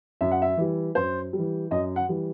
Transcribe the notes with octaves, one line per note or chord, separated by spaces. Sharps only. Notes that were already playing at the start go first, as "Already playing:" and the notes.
F#2 E5
F#5
E5
E3 G3
F#2 C5
G3
E3
F#2 D#5
F#5
E3 G3